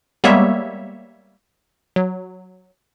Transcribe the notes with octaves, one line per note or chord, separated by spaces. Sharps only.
G3 G#3 A#3 B3 C#5 E5
F#3